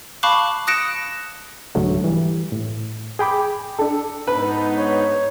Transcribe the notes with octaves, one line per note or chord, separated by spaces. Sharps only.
F5 A5 B5 C#6 D6 F#6
D#6 F#6 A#6 C#7 D7 E7
C2 G#2 D3 F#3 A3
E3 G3
A2
G#4 G5 B5 D6
D4 A4
G#2 B3 D#4 B4
C#5